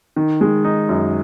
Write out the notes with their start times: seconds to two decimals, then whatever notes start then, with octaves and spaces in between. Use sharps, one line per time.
0.16 D#3
0.41 G#3
0.64 D#4
0.89 F#2